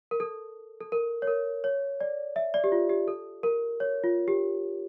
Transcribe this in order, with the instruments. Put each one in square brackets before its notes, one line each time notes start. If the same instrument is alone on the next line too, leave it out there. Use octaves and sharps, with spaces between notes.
[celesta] A#4
A4
A4
A#4
C#5
A#4
C#5
D5
E5
D5
G4
F4
G4
A4
A#4
C#5
F4
G4